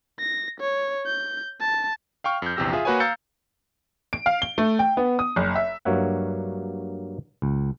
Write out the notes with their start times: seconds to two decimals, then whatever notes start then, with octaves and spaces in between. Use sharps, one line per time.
0.20 A#6
0.60 C#5
1.06 G6
1.61 A5
2.24 F5 G5 C#6 F6
2.42 F2 G6
2.56 A#1 E2 C3 G4 E6 A#6
2.73 F4 G#4 E5 D#6
2.85 A#3 F#4 B4 C#5 G#5
3.00 F5 A#5 E6 G6 A6 C#7
4.13 D7
4.26 F5
4.42 G7
4.58 A3
4.79 G5
4.97 B3
5.19 D#6
5.36 F#1
5.56 E5
5.85 G2 F#3 A#3 C#5 E5 F#5
7.42 C#2